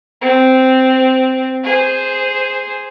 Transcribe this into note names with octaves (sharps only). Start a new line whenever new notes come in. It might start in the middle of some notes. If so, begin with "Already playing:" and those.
C4
G#4 C5